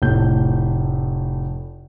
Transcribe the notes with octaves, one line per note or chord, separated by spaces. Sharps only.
F1 A2 G6